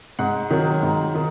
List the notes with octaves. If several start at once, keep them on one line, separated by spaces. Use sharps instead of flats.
G#2 F#5
D#3 F#3
G#2
D#3